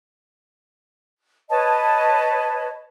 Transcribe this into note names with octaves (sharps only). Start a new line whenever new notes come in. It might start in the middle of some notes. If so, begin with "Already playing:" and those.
B4 C#5 D#5 A5